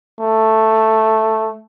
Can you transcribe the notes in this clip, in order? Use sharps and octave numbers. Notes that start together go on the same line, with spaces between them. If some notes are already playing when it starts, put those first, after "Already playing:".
A3